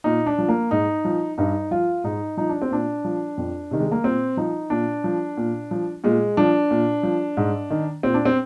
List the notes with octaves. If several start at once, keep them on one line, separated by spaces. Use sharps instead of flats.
A#2 D#4
D4
F3
A#3
G#2 D#4
F3
G2 D#4
F3 F4
G#2 D#4
F3 D#4
D4
C4
A#2 D4
F3
F2
C3 D#3
G#3
A#3
A#2 C4
F3 D#4
A#2 D4
F3
A#2
F3
A#2 G#3
F3 D4
A#2
F3
G#2
D#3
A#2 C4
D4
C4